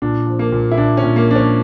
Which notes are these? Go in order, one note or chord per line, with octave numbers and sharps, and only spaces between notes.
A#2 D4
F3
A#3
A#2
E4
A#2 D4
C#4
A#2
A#3
F3 D4
C#4